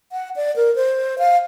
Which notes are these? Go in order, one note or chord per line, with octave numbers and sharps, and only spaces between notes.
F#5
D5
A#4
C5
F5